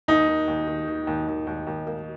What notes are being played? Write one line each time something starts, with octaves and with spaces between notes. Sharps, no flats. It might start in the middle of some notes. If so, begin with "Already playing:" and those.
D#2 D#4
D#3
D#2
D#3
D#3
D#2
D#2
D#2
D#2
A#3